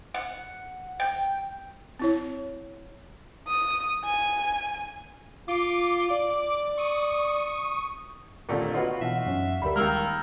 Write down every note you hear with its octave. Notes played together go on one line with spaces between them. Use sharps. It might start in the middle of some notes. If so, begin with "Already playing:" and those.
F#5
G5
C4 E4 C#5
D#6
G#5
F4 D6
D5
C#6 D#6
D#2 A#2 D3 A3 C4 A#4
F4 F#4 B4 C#5 D#5
B2 E3 D#4 E5 F#5
F#2 C#4
D2 G3 A#4 B5
D#3 G3 G#3 A#3 A#5 E6 F6